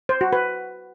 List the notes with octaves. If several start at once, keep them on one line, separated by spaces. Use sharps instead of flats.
C5
F#4
B4